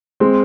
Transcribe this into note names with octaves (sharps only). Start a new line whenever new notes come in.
G#3 C4